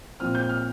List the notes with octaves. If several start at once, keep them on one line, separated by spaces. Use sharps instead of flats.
A#2 F3 C4 F6
G6
F6